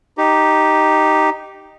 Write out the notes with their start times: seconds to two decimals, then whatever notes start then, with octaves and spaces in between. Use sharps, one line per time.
0.18 D#4 G4